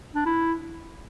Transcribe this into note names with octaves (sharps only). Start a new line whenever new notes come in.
D4
E4